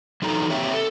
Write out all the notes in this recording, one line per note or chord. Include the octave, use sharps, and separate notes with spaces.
E3 F#3 D#4 A4 A#5
A#3 C4 G4 C#5 E5 G5
A4